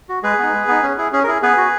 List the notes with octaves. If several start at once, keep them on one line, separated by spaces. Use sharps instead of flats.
F#4
G#3 G#4 B4
B3 D#4
G#3
B3 D#4
C#4
E4 G#4
C#4 G#4
A#4
E4 G#4
B3 G#4 B4
F#4